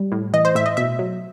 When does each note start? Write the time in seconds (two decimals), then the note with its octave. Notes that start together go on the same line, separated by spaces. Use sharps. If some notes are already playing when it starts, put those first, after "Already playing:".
Already playing: G3
0.12 A2
0.33 E3 D#5
0.45 C5
0.55 A2 E5
0.66 D#5
0.77 B2 E5
0.99 F#3